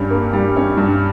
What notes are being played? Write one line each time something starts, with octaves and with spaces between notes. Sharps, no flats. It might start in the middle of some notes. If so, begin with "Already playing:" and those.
Already playing: G2 G3 C#4
A#3
G3
C#4
G2